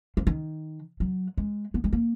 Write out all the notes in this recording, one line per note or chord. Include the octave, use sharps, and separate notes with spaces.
F3
D#3
F#3
G#3
B3
G#3
A#3